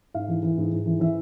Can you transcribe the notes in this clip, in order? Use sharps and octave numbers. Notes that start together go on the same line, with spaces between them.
G#2 F5
E3
E3
G#2
G#2
E3
E3 E5